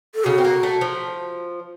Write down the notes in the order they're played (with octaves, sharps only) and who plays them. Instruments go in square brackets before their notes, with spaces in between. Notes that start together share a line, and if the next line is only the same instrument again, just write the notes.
[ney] A4
[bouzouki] C#3 [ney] F#4
[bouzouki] C4
A#3
A3
F3